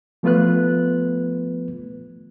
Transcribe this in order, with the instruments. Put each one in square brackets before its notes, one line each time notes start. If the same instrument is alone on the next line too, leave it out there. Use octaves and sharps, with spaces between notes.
[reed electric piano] F3 A3 B3 F4 B4 F#6